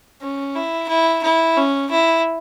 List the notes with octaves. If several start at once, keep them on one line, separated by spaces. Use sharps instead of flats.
C#4
E4
E4
E4
C#4
E4